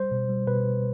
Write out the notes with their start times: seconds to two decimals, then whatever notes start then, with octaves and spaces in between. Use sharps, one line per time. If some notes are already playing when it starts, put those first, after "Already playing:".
Already playing: G3 C5
0.12 B2
0.29 G3
0.47 B2 B4
0.66 B2